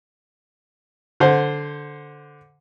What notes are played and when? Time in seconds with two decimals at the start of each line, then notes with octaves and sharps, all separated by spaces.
1.20 D3 C5